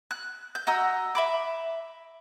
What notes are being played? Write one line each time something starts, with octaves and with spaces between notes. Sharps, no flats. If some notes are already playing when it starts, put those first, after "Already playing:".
F#6
G6
F#4 D#5 A#5 E6
E5 B5 D6